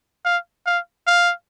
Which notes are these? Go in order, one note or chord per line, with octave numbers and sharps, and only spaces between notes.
F5
F5
F5